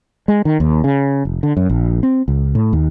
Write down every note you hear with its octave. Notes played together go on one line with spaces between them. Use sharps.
G#3
D#3
D#2
C#3
F1
D3
F#2
A#1
C4
C#2
A2
D#2